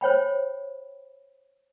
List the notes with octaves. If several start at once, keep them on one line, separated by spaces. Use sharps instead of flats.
C5 C#5 G5 B5